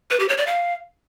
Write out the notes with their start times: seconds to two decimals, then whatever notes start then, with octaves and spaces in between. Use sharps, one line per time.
0.11 B4
0.20 G4
0.29 C#5
0.38 D5
0.47 F5